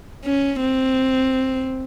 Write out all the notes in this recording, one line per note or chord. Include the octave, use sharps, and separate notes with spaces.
C#4
C4